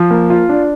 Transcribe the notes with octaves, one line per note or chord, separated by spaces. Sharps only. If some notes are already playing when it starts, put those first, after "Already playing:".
Already playing: F3
A#3
F4
D4